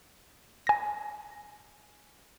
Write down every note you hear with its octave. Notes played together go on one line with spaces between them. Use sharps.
G#5 A#6